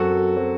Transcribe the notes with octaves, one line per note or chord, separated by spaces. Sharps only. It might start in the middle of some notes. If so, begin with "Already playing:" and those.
Already playing: F#2 F#3 C4 F#4 A4
F#3 C4